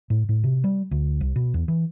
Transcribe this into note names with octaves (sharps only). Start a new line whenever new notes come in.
A2
A2
C3
G3
D2
C2
B2
E2
E3